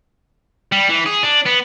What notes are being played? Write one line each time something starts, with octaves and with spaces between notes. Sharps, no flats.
G3
E3
G#4
D4
B3